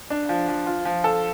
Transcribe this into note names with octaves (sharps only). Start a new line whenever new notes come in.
D4
F3
F3
F4
F3
A4